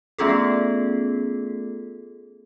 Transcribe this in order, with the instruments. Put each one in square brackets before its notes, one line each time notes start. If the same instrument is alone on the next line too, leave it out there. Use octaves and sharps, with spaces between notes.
[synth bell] A3 B3 C#4 F4 G#4 A4